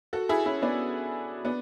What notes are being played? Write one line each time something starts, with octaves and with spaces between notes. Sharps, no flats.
F#4 A4
E4 G#4
C#4 E4
B3 D4
B3 D4